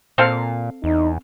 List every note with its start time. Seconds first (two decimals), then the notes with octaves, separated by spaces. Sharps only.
0.18 A#2 C4 A4 F5
0.84 E2 D#4